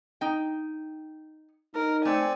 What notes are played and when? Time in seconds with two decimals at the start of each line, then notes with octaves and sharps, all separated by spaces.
0.21 D#4 G5
1.75 D#4 A#4
2.05 A3 C4 D5 G#5